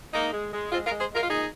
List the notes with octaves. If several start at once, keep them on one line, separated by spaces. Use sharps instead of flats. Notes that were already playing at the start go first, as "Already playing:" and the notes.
G#3 A#3 D#4
G#3
G#3
G#3 C4 F4
F4 A#4
G#3
G#4 C5
G#3 F4 A#4
F4
A#2 D#4 G#4